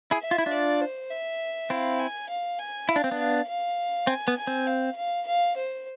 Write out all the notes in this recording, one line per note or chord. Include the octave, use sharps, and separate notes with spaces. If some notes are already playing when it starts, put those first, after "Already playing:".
E4 G#4
E5
F4
E4
D4 F4 D5
C5
E5
C4 E4 F5
G#5
F5
G#5
E4 F5
D4
C4
B3 D4
F5
F5
C4 G#5
B3
G#5
C4
F5
F5
F5
C5